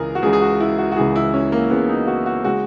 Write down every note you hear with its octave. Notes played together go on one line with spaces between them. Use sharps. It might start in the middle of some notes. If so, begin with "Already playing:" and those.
Already playing: C#2 C#3 E3 G#3 G#4 A#4
F#4
C#2 C#3 E3 G#3 G#4
G#4
F#4
E4
F#4
F#4
C#2 C#3 E3 G#3 G#4
E4
C#4
A#3
C#2 C#3 E3 G#3 B3
D#4
F#4
F#4
C#3 G#3 F#4